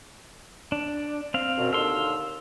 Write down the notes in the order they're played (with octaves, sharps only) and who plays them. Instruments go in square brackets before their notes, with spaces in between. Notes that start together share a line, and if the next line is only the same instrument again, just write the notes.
[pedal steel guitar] D4
C4 F5
[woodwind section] F#2 B2
[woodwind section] D#2 D3 E6 [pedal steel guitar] F5 C6